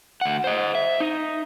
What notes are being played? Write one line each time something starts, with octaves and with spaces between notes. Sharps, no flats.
D2 F#5
C5 D#5
E5
D#4